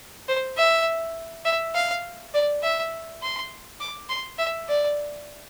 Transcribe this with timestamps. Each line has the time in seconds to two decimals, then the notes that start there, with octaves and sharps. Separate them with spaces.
0.28 C5
0.57 E5
1.45 E5
1.75 F5
2.34 D5
2.63 E5
3.22 C6
3.80 D6
4.09 C6
4.38 E5
4.68 D5